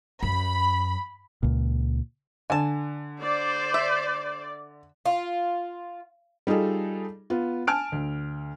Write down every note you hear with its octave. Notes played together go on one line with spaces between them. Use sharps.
F#2 B5
C#2 A#2
D3 G#5 A5
C5 D5
E5
F4
G3 D#4 F4 G#4 A4
B3 F4
G#5 A5 F6 D7
D2